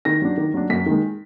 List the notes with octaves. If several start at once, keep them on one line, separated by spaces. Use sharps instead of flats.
D#3 A#6
F#3 D4
D#3
F#3 D4
F#2 B6
D#3 G#3